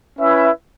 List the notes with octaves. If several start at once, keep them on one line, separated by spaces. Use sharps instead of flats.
C#4 E4 B4 E5